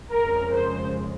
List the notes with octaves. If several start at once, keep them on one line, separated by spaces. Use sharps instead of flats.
F2 C#3 G#3 A#4
C5